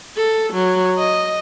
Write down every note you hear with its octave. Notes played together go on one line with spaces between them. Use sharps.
A4
F#3
D#5